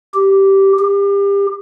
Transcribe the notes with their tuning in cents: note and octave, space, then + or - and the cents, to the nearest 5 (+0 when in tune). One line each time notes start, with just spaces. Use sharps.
G4 -10
G4 +30